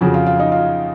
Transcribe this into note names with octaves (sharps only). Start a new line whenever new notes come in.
F2 C#3 F3 F#4
F4
F4
D#4
F4